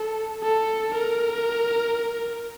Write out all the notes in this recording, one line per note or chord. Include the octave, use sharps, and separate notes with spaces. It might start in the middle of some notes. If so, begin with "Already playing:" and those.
Already playing: A4
A4
A#4